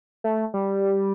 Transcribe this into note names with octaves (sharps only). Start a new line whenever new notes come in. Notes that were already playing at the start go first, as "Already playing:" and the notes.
A3
G3